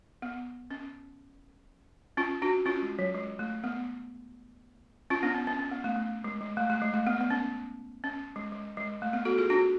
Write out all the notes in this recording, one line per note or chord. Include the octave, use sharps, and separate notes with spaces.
B3
C#4
C#4 F4
D4 F#4
C#4 F4
G#3
F#3
G#3
A3
B3
C#4 F4
B3 D4
C#4
C#4
C#4
B3
A3
A3
G#3
G#3
A3
A3
G#3
A3
B3
B3
C#4
C#4
G#3
G#3
G#3
A3
B3
F#4 A4
F4 G#4
D4 F#4